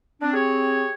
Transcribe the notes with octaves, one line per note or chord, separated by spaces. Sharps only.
C4 D4
G4 G#4 C#5